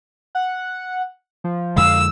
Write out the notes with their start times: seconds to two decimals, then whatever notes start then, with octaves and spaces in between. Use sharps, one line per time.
0.35 F#5
1.44 F3
1.76 F2 D3 G#3 F5 E6